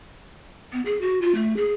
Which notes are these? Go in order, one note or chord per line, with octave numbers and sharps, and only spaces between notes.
B3
G#4
F#4
F4
A3
G#4